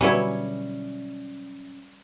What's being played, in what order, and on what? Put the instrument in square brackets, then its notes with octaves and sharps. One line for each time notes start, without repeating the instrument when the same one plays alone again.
[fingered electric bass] B2 D3 [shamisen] F#3 B4 [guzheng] G3 E4 C#5 [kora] C#4